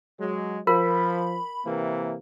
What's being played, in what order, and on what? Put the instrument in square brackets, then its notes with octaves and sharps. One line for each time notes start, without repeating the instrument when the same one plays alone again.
[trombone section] F#3 G#3
[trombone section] F3 [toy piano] A#4 [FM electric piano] B5
[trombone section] C3 E3 A#3